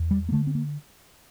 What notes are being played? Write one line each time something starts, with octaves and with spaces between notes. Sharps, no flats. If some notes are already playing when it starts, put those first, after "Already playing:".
Already playing: E2
G3
A#3
D3 A3
C4
A#3